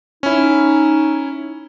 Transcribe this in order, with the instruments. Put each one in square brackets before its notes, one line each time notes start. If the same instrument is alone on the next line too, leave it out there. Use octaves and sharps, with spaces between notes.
[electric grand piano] C#4 E4 [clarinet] D#4